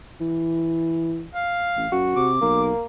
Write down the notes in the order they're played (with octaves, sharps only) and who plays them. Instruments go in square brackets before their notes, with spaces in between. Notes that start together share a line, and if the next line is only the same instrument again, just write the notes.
[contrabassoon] E3
[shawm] F5
[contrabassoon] A1
[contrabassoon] F#2 [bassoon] F#4
[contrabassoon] C3 [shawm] D6
[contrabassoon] B1 [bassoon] A#3